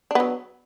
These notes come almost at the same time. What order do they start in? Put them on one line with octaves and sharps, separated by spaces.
D4 B3 F#3